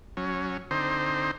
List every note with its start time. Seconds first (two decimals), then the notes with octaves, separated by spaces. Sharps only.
0.17 F#3 C#4
0.71 D3 C4 D#4 C5